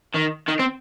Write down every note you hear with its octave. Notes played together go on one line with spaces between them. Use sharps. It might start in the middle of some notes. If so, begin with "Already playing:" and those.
D#3
D#3
C4